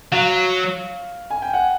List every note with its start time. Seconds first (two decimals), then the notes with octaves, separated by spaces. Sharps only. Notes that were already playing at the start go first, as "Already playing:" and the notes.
0.12 F#3 F5
1.30 G#5
1.42 G5
1.53 F#5